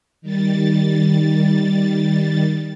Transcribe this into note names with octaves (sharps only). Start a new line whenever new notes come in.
D#3 G3 A6